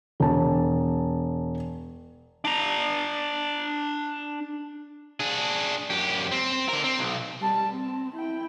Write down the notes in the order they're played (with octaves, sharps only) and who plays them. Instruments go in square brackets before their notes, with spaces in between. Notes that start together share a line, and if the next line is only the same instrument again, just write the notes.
[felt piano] E1 A5
[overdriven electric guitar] D4 A#5
D4 G#4
F#2 G4
C4
D3 A#4
C4
B1
[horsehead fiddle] G3 A5
C4
E4 G5